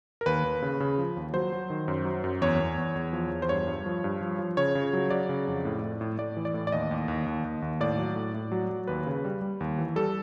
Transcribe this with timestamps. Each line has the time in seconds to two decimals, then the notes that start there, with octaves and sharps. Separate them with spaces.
0.21 A#4
0.26 D#2 B4
0.44 D#2
0.62 C#3
0.80 C#3
0.98 F3
1.17 D#2
1.33 F#3 C5
1.53 F#3
1.70 D#3
1.88 F#2
2.05 F#3
2.24 F#2
2.42 E2 C#5
2.60 E2
2.78 E2
2.96 E2
3.13 F3
3.31 E2
3.42 C5
3.49 G2 C#5
3.67 G2
3.86 F3
4.04 G2
4.21 F3
4.39 F3
4.57 C#3 C#5
4.75 C#3
4.93 F#3
5.10 F#3 D5
5.29 C#3
5.47 F2
5.65 A2
5.83 A2
6.01 A2
6.18 A2 D5
6.37 E3
6.45 D5
6.54 A2
6.67 D5
6.72 D#2 D#5
6.91 D#2
7.08 D#2
7.26 D#2
7.45 D#2
7.62 D#2
7.80 A2 D5
7.98 F#3
8.16 A2
8.34 A2
8.52 F#3
8.70 F#3
8.87 D#2 B4
9.07 C#3
9.24 G3
9.41 G3
9.60 D#2
9.78 E3
9.96 G3 A4